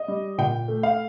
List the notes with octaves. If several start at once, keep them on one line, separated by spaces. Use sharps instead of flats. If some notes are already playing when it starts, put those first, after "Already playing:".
Already playing: D#5
G3
A#2 G5
A3
F5